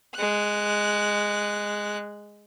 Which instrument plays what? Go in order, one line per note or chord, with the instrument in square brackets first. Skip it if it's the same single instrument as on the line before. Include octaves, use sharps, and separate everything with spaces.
[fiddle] G#3 F#6